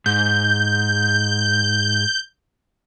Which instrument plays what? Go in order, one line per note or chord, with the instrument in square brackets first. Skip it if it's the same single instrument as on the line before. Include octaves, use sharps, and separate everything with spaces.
[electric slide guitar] G#2 [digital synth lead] G6